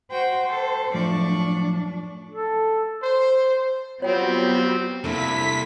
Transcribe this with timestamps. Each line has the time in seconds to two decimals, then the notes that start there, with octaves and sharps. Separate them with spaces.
0.11 F#4 C5 G5
0.49 A4
0.94 F#2 A2 F3 D4 D5 C#6
2.31 A4
3.03 C5
4.02 F#3 G3 B3 C4 F4 F#4 C#5 G5
5.04 C2 C3 A#3 D4 E4 A4 B6